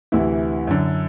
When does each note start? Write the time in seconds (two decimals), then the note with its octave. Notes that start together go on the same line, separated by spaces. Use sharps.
0.12 D2 C3 E3 E4
0.67 F#2 D3